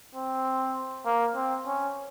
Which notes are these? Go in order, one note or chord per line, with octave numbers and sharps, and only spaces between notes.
C4
A#3
C4
C#4